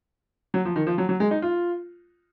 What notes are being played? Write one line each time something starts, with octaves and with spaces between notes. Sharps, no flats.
F#3
F3
D#3
F3
F#3
F#3
G#3
D#4
F4